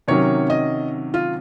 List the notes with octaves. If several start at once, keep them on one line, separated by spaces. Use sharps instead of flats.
C3 D#3 F#3 C#4 C#5
D#5
F4